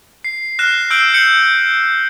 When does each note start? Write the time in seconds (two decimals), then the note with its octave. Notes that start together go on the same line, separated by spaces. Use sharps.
0.24 C7
0.59 F6 F#6 A#6 C7 E7
0.91 E6 G6 C7 D7 F#7
1.14 G6 C#7 F#7